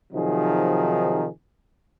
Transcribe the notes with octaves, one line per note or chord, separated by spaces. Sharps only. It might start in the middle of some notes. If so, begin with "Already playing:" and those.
C3 D#3 F3 F#3 D#4 G#4